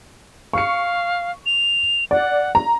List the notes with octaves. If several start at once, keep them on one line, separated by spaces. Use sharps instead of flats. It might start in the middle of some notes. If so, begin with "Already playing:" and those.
F5 C#6 C#7
F7
D5 F#5
A#5